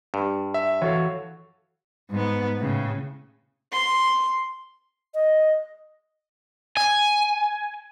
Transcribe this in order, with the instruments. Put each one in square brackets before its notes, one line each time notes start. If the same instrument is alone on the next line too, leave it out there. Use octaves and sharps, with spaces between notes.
[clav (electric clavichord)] G2
[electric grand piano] E5
[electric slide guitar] E3 A4 F5 [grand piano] F#4 C#5
[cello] G#2 B3
A2 C#3
[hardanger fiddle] C6
[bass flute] D#5
[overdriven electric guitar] G#5